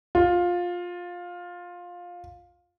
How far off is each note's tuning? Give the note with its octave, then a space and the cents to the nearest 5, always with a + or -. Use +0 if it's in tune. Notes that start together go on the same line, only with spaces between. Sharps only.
F4 +15